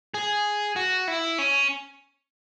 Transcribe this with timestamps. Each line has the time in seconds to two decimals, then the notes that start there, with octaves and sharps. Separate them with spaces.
0.14 G#4
0.76 F#4
1.08 E4
1.38 C#4